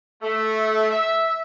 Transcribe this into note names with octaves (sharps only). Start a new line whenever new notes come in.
A3
E5